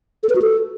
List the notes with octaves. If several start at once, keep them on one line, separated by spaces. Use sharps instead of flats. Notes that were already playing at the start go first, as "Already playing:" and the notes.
A4
B4
F#4
A4